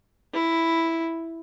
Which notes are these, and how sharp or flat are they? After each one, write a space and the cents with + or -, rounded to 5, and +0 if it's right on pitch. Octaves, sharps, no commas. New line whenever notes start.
E4 +0